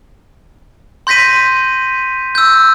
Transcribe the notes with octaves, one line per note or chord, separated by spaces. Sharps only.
C6 G6 A#6 B6 D#7
E6 G6